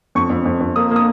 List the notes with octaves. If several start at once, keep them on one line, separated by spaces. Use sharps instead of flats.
F2 C#6
F2
F2
F2
A#3 D#6
A#3 D#6